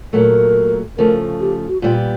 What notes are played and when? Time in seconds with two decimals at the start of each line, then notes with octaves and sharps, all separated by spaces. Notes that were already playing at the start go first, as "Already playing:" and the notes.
0.13 A#2 F#3 A3 A#4
0.98 C#3 F3 A3 A#4
1.40 G4
1.68 F#4
1.82 A#2 G3 B3 F4